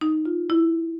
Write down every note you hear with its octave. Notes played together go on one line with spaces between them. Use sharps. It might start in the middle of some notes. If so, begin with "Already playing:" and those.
D#4
F4
E4